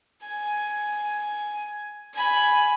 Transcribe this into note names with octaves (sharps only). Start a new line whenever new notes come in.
G#5
G#5 B5